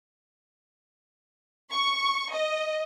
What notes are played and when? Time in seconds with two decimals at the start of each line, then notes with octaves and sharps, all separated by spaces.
1.73 C#6
2.33 D#5